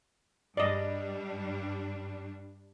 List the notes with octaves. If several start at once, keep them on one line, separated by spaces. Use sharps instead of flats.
G2 G3 D4 D5 D#5